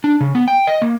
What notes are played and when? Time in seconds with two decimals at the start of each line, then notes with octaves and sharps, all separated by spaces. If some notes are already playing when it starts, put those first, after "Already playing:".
0.04 D4
0.21 C#3
0.35 B3
0.48 G5
0.67 D#5
0.82 A#3